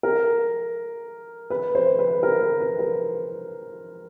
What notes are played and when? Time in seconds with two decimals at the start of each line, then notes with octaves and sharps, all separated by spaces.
0.03 A#4
1.50 B4
1.75 C5
1.99 B4
2.23 A#4
2.41 B4
2.61 B4
2.79 A#4